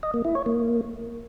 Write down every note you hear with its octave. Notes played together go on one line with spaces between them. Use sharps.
D#5
A#3
E4
C#5
A#3